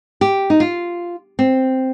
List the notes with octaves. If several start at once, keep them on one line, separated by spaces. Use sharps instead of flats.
G4
D#4
F4
C4